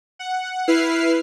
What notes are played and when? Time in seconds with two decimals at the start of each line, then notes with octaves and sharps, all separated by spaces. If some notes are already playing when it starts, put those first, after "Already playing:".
0.19 F#5
0.67 E4 B4 F6 C7